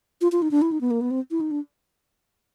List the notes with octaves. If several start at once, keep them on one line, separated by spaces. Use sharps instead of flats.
F4
F4
D#4
D4
E4
D#4
B3
A#3
B3
C4
E4
D#4
D4